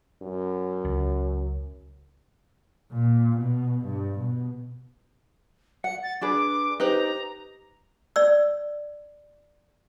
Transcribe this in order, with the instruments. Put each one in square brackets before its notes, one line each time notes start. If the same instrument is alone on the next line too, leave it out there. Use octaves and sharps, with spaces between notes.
[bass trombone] F#2
[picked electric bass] C#2
[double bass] A#2
B2
G2
B2
[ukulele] F#5 [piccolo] C#7
[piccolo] A6
[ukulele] D4 G#4 B4 [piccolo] D6
[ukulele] D#4 [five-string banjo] G4 B4 C5 [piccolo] A#5
[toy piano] D5 E6